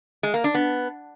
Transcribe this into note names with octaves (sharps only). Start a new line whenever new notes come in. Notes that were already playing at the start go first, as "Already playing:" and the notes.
G#3
A#3
D4
B3